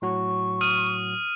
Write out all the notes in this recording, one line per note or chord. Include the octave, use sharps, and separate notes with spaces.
A2 F#3 F#4 C#6
D#6 F6 D#7